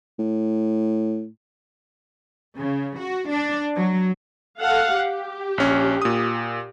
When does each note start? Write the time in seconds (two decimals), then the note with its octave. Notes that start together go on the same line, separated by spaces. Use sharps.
0.19 A2
2.56 C#3
2.99 F#4
3.30 D4
3.75 F#3
4.60 A4 F5 F#5
4.96 G4
5.58 A#1 C#4
6.02 A#2 D#6